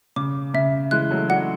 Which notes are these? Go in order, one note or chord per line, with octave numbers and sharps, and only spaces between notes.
C#3 D6
C#3 E5
E3 G#3 F#6
F#3 A3
D4 F#4 F#5